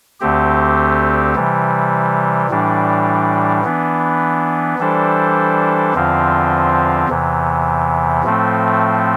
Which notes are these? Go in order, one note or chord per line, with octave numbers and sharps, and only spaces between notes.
D2 D3 A3 C4 G4
C3 E3 G3
A2 E3 G3 D4
E3 B3 D4
E3 G3 D4 A4 C5
E2 D3 F3 C4 F4
E2 C3 E3
A2 F3 A3 C4